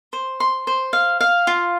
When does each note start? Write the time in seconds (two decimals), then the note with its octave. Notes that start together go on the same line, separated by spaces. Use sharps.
0.13 C5
0.40 C6
0.67 C5
0.93 F5
1.21 F5
1.47 F4